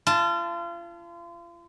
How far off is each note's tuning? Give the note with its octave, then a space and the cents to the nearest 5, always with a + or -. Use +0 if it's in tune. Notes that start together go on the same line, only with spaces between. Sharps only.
F4 -35 A5 +0